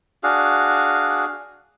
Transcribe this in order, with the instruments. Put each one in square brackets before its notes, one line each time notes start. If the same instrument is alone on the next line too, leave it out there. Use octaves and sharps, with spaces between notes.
[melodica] D4 F#4 G#4 F5